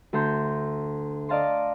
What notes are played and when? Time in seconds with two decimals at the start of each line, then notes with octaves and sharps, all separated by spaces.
0.13 D2 A4 A#5 C6 G6
1.29 D5 D#5 F5 A5 A#5 C6